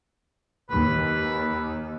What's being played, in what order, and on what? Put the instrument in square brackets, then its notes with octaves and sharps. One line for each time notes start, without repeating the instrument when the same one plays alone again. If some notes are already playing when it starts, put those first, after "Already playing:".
[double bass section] D#2 [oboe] B4